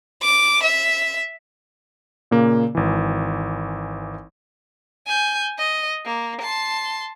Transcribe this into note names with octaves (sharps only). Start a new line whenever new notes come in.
D6
E5
A#2 C#3 A#3
G#1 E3
G#5 G6
D#5
A#3
A5 C6